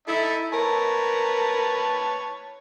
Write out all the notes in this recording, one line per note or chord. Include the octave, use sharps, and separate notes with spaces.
D#4 E4 A4 E5
A#4 B4 C#5 A5